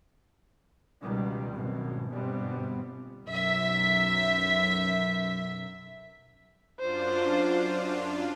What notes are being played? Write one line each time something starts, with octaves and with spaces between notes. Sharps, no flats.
C#2 B2 D#3 G3
G#1 F#2 B2
G1 G#2 B2 G3 B3 C4
B1 F#2 E5
F#2 D4 F4 C5